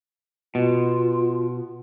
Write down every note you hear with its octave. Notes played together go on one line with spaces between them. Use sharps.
B2 F4